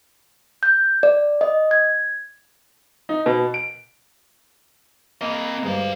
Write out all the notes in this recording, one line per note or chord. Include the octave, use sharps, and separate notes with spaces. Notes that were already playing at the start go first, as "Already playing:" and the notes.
G6
D5
D#5
G#6
D#4
B2
D7
A#3 C4 D#5
D2 G2 G3 G#3 F5